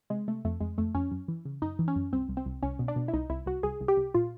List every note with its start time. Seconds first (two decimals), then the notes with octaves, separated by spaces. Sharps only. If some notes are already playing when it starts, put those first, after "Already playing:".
0.10 C3 G#3
0.28 C3 A3
0.45 F2 A3
0.61 F2 G#3
0.78 F2 A3
0.95 F2 C#4
1.11 F#2
1.28 E3
1.45 C#3
1.62 F#2 D#4
1.79 E3
1.88 C#4
1.96 F#2
2.13 C2 C4
2.29 C2
2.37 C4
2.46 C2
2.63 C2 C#4
2.79 B2
2.88 D4
2.96 B2
3.08 E4
3.14 C2 D#4
3.30 C2 E4
3.46 C2 F#4
3.63 C2 G#4
3.81 C2
3.88 G4
3.97 C2
4.14 A#2 F4